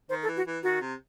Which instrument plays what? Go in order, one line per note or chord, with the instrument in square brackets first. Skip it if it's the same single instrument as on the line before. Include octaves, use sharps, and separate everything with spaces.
[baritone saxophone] D#3 [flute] C5
[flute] A4
[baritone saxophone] E3
[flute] F#4
[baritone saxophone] E3
[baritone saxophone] D#3 [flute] F#4
[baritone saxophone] C3